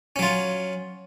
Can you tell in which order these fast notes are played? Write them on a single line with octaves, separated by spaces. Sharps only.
C#4 F#3 F4